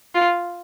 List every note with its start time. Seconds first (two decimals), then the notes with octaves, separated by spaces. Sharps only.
0.15 F4